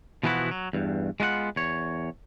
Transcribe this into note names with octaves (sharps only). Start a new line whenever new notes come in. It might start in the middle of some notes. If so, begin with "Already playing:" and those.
B2 E3 F3 B3 E4 F#4
F#3
E2 G2
G#3 B3 F4 D#5 F#5
E2 C#5